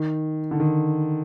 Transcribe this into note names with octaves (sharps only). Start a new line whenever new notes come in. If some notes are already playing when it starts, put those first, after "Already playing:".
Already playing: D#3
D3
D#3